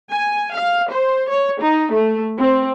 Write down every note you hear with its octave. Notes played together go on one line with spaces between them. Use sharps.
G#5
F5
C5
C#5
D#4
A3
C4